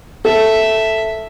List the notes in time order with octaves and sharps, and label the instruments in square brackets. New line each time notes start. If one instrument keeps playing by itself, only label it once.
[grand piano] A4 [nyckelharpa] E5